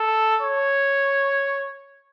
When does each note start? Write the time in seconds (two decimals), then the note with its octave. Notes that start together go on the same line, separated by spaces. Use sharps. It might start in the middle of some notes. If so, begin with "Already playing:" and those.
Already playing: A4
0.42 C#5